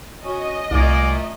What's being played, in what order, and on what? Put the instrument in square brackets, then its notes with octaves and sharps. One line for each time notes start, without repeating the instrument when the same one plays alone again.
[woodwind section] C#4 F#4 [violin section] D#5
[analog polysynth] C2 [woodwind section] A#2 A3 [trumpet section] D5 F5 G#5